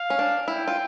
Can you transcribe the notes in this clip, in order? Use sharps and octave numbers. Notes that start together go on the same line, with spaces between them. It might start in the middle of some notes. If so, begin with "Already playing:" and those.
Already playing: F5
C#4
D4
E4 G5
F4